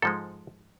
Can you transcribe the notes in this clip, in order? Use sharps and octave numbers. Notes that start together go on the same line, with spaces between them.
G#2 F3 G#3 A4